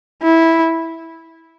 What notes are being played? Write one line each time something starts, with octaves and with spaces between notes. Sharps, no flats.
E4